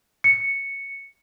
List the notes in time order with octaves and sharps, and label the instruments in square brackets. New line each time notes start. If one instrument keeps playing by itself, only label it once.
[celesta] C#7